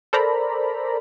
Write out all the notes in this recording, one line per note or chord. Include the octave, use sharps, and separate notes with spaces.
A4 A#4 C5 D5 A#5 B5